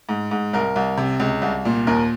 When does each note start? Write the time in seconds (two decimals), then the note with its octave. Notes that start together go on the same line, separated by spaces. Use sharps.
0.09 G#2
0.31 G#2
0.53 C2 A#4
0.76 C2
0.97 C3
1.20 C#2
1.42 C2
1.65 A#2
1.87 D#2 A#4